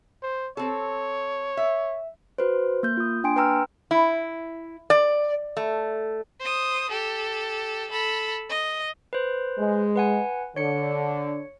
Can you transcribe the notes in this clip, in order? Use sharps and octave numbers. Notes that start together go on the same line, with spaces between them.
C5
C4 A4 C#5
E5
F#4 B4 C5
A#3 G6
F4 D#6
A#3 D4 G5 G#5 C6 D7
B4 G5 A#5 E6 F6
E4
D5
A3
C5 D#6
G4 A4
A4 B5
D#5
B4 C5
G#3
B4 F#5 G#5
D3 C#5 C#7